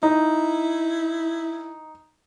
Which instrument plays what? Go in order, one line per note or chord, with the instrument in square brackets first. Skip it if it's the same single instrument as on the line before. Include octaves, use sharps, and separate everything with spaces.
[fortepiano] D#4 [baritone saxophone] E4